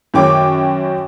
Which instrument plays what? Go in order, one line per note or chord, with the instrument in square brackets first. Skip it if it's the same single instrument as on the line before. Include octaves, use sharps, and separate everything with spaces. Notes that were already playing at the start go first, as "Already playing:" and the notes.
[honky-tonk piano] F#2 D#3 C#5 G5 D6